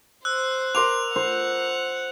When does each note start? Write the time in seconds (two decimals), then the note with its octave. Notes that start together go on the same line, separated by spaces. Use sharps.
0.25 C5 E6 F#6
0.75 A#4 C6 D6 F7
1.16 C5 F#5